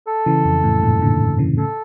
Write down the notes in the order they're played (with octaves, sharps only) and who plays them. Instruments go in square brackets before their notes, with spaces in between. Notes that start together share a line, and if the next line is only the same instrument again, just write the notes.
[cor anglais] A4
[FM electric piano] C#3 E3
F2
F2 A2
G2 A#2
A#2 D3
C#3 E3
[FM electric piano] A2 C#3 [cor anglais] A4